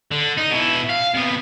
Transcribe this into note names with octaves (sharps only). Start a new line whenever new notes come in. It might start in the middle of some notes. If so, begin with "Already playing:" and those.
D3
D#4
B2 E4
F5
C3 B3